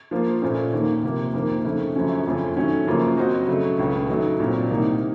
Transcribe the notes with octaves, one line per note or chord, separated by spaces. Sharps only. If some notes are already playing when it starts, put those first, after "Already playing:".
F3 A#3 F4
A#2 A3 C#4 F4 C5
D#2 D#3 A#3
C3 F3 A#3
F2 D#3 A#3
F2 C#3 A3 D#4
F#2 C#3 F3 A3 C#4
F2 C#3 A3 C#4 F4
D#3 F#3 A3 C#4
F#2 C#3 F3 A#3 F4
F#3 C4 F#4 C5 D#5
C#3 F#3 A3
C#2 C#3 A3
D#3 F#3 A3 D#4
A#2 F#3 C4
C2 C3 D#3 A#3 D#4